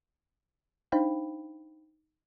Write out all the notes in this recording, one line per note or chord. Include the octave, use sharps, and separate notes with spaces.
D4 D#4 C5 F5 G5 B5